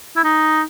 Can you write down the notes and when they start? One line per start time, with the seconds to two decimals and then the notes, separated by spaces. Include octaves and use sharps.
0.17 E4
0.24 D#4